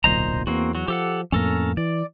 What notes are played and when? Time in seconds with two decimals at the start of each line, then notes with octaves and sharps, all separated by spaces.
0.04 D1 B1 A#2 C5 D#5 A#5
0.47 E2 A#3 C4 F#4
0.75 F#3 F#4
0.88 F3 G4 A4 F#5
1.32 F2 A2 A#3 C#4 A4 A#4
1.77 E3 D5